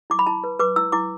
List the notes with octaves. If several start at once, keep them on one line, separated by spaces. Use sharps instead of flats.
E4 D6
B5
E4 A5
B4
B4 D6
E4 E6
E4 D6